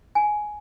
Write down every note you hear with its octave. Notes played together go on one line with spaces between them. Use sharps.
G#5